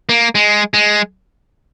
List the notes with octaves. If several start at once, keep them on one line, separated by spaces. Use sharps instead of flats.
A#3
G#3
G#3